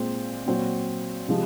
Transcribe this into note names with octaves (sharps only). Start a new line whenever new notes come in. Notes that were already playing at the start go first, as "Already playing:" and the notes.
Already playing: A#2 G#3 C4 F4
A#2 F#3 C4 F#4
C3 F3 G#3